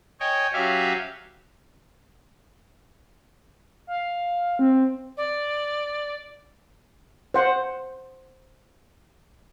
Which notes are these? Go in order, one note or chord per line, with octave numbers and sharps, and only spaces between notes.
C#5 D#5 G5 G#5
F#3 C#4 G4 E5 F5
F5
C4
D5
C5 F#5